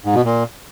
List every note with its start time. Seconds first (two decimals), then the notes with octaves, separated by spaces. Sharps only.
0.05 G#2
0.15 B2
0.25 A#2